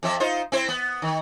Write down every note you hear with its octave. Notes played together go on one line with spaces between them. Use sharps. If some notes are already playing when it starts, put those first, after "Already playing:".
F2 F3 E5
D#4 F4 C5
C4 E4 C5
B3
D#3